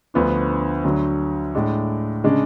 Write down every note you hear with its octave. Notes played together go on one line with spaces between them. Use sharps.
D2 D3 F3 B3 D4
D2 D3 F#3
A2 G#3 D4
C#3 G#3 D4